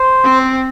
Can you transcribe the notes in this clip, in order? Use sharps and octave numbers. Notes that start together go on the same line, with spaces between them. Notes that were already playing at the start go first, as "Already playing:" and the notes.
Already playing: C5
C4